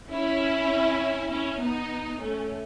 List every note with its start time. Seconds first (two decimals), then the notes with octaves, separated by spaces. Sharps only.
0.11 C#4 E4
1.30 C#4 E4
1.61 B3 D#4
2.20 A3 C#4